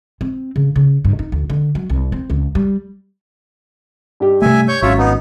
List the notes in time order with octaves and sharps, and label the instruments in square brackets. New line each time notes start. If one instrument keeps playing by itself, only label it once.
[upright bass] C4
C#3
C#3
G2
D#4
D2
D3
F#3
C2
C4
C#2
G3
[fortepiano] G2 G4
[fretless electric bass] C3 G3 A3 [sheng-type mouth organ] E5 G#5
[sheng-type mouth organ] C#5 C#6 G6
[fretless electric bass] G#1 [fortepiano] F#2 F#3 [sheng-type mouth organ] F4 C#5 E5
[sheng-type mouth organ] B3 D#4